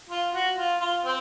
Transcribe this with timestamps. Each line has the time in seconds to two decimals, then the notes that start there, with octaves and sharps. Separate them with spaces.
0.09 F4
0.33 F#4
0.57 F4
0.81 F4
1.05 C4